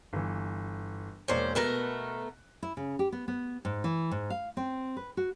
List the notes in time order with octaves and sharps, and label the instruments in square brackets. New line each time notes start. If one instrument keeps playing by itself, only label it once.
[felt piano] G1 E3
[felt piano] E1 A#3 D5 [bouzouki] C#4 C5
[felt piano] B2 F#6 A#6 [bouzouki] A3 B3 A#4
[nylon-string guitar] E4
C#3
G4
B3
B3
G#2
E3
G#2
F5
C4
B4
F#4